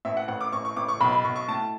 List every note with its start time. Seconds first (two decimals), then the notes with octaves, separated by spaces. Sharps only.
0.05 A1 E5
0.17 F#5
0.28 A1 F#5
0.41 D6
0.52 A1 C#6
0.65 C#6
0.76 A1 D6
0.88 C#6
1.00 B1 B5
1.12 B5
1.24 B1 C#6
1.36 C#6
1.48 A2 A5